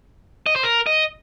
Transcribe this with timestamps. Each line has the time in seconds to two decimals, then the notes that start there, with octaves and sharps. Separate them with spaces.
0.46 D#5
0.56 C5
0.63 A#4
0.87 D#5